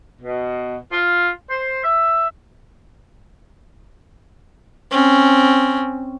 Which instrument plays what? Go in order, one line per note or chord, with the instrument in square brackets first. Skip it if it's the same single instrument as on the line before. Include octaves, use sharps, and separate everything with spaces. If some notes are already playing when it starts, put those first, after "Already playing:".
[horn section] B2
F4
C5
E5
[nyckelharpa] C4 C#4